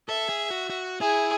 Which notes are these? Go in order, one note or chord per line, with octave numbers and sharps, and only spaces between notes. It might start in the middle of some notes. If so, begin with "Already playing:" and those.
A4 E5
G#4
F#4
F#4
E4 G#4